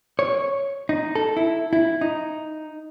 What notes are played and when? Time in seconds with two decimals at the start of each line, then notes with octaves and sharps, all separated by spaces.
0.19 C#5
0.89 D#4
1.15 A4
1.37 E4
1.73 E4
2.01 D#4